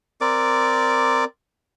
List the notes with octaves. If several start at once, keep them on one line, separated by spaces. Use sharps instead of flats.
C4 A#4 D5 D6